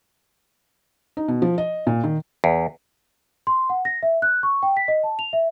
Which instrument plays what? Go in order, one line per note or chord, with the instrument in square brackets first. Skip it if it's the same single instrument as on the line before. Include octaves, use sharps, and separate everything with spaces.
[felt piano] D#4
B2
F3
D#5
A#2
D#3
[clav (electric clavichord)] E2
[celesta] C6
F#5
A#6
E5
F#6
C#6
G5
B6
D#5
A5
F7
E5